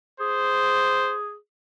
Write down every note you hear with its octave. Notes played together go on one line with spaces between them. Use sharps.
G#4 C5